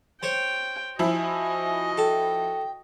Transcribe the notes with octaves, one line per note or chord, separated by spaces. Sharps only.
C5 C#5 G5
F3 E4 F#4 D#5 G#5
A4 G5